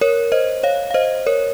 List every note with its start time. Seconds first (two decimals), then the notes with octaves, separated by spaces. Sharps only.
0.01 A#4 C#5
0.32 C5 D#5
0.63 C#5 F5
0.91 F5
0.94 C5 D#5
1.26 A#4 C#5